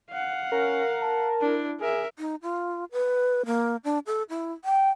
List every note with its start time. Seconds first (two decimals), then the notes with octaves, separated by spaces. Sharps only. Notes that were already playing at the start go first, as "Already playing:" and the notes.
0.11 F5 F#5
0.52 C#4 A#4
1.02 A5
1.41 D4 E4
1.80 G#4 A#4 E5
2.18 D#4
2.42 F4
2.92 B4
3.46 A#3
3.84 D4
4.07 A4
4.30 E4
4.65 G5